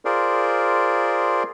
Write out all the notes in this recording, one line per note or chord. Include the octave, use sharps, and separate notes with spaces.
F4 G#4 A#4 C5 D5